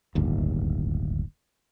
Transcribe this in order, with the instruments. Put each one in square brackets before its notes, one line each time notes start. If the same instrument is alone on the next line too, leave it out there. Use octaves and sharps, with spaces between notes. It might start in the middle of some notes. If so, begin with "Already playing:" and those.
[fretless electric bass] D1 G1 D#2